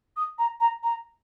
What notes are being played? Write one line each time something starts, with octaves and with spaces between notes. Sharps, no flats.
D#6
A#5
A#5
A#5